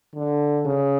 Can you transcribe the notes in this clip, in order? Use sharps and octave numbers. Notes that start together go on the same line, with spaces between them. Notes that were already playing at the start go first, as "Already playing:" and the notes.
D3
C#3